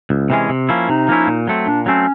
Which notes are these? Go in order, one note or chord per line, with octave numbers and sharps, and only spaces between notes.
C#2
C3 E3 G#3 C#4
C3
F3 A#3 C#4 E4
C3 D#4
F3 A#3 C#4 E4
A#2
F#3 A3 C4
A#2 D4
F#3 A3 C4 C#4